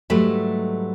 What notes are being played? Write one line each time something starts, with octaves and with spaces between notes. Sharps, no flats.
G#2 F#3 G3 A3 B4 E5